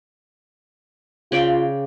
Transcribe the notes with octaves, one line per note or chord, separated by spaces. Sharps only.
C#3 F4 D5 G5